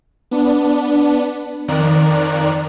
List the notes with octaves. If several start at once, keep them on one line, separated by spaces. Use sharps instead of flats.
B3 D4
F2 D#3 A#4 D5 F#6